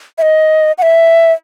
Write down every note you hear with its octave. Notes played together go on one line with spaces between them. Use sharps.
E5
D#5
F#5
E5